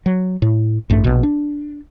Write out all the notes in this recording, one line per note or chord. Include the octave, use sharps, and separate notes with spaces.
F#3
A2
A1 G2 A3
A#1 B2
D4